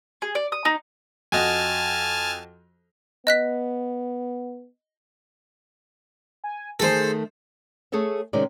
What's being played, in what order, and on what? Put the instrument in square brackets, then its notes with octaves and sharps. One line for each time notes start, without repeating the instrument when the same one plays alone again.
[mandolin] G#4
D5
D#6
D#4
[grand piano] F2 F#4 D#5 [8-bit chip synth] G#5 A5 F6
[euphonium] B3 [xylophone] D#5 F#6 B6
[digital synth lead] G#5
[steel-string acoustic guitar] D#3 A3 [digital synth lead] G#4 [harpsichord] A4 C5
[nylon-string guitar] A3 G#4 A4 C#5 E5
C3 D#3 G#3 C4 C#4 D5